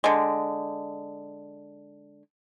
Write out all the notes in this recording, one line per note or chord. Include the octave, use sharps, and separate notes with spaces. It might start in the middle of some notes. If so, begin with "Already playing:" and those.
D3 G#3